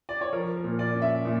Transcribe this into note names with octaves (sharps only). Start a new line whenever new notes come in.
D5
C#5
F3 A#4
A#4
A#2
D5
C#4
E5
A#2